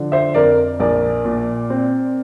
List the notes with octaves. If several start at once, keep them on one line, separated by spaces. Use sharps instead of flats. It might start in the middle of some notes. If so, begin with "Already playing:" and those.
Already playing: D3 F3
C5 E5
F2 A#4 D5
A#1 A#4 D5
A#2
C4